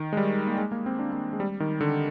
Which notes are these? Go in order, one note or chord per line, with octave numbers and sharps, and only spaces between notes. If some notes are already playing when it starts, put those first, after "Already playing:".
Already playing: D#3
G#3
G3
A#3
G#3
A#3
C4
D4
A#3
G#3
G3
D#3
D3